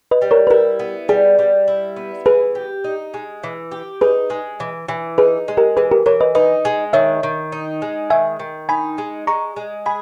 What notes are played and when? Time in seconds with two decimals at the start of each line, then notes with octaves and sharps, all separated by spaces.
0.11 B4 D#5
0.22 G3
0.31 A#4 C#5
0.47 B4
0.50 E4 G4 A#4
0.80 B3
1.09 G3 G#4
1.39 G3
1.68 E4
1.96 B3
2.26 E3 G#4 B4
2.55 G4
2.84 D#4
3.14 G#3
3.44 E3
3.72 G4
4.01 D#4 G#4 B4
4.30 G#3
4.60 E3
4.89 E3
5.18 D#4 G#4 B4
5.48 G#3
5.57 G4 A#4
5.77 E3 G#4 B4
5.91 G4 A#4
6.06 E3 A#4 C#5
6.21 B4 D#5
6.35 D#4 B4 D#5
6.65 G#3
6.93 D#3 C#5 E5
7.23 D#3
7.52 D#4
7.82 G#3
8.10 D#3 E5 G#5
8.40 D#3
8.69 D#4 G#5 B5
8.98 G#3
9.27 G#3 A#5 C#6
9.56 G#3
9.86 G#4 G#5 B5